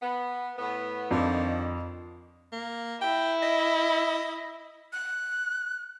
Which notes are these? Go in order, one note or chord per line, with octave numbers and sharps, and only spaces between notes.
B3
A2 B3
F2 D3 D#3 F3
A#3
E4 G5
D#5
F#6